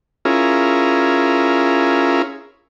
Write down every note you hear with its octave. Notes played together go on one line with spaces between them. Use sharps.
C#4 E4 F4 G#4 A#4